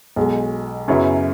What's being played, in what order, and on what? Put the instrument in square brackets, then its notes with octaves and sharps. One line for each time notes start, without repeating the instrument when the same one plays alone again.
[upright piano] B1 B2 G#3
F#2 C#3 F#3 B3 E4